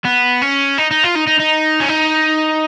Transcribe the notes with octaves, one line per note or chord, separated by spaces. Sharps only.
B3
C#4
D#4
D#4
F4
D#4
D#4
D#4
C#4
D#4